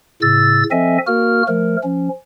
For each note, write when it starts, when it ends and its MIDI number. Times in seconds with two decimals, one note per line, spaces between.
0.22 0.64 45
0.22 0.64 49
0.22 0.64 88
0.22 0.64 93
0.71 0.98 53
0.71 0.98 60
0.71 0.98 69
0.71 0.98 75
0.71 0.98 76
0.71 0.98 80
1.07 1.43 58
1.07 1.43 66
1.07 1.43 70
1.07 1.43 89
1.48 1.77 53
1.48 1.77 57
1.48 1.77 70
1.83 2.09 53
1.83 2.09 61